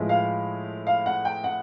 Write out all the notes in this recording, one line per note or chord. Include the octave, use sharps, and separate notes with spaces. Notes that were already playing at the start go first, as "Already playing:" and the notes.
Already playing: A2 F3 G#3 B3 E4
F5
F5
F#5
G5
F#5